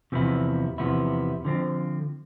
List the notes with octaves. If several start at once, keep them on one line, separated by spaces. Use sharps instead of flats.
E2 C3 F3 B3 E4
E2 C3 F3 B3 E4
D3 F3 C4